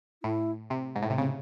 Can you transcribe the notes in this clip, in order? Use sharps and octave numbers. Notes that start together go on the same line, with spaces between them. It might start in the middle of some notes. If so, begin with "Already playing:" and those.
A2 E4
C3
G#2
A2
C3
C#3 C4